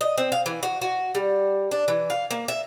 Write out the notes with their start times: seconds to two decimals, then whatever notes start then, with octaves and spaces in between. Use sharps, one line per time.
0.01 D#5
0.18 C4
0.32 F5
0.46 E3
0.63 F#4
0.81 F#4
1.15 G3
1.71 D4
1.88 E3
2.10 F5
2.31 A#3
2.48 E5